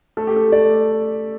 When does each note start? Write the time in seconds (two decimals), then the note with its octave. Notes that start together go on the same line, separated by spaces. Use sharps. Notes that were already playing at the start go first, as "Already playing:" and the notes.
0.17 A3 A4
0.27 G4
0.36 A4
0.52 A3 D5